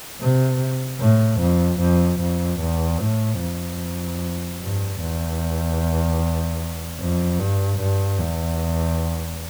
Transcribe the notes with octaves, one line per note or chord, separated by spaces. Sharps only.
C3
A2
F2
F2
F2
E2
A2
F2
G2
E2
F2
G2
G2
E2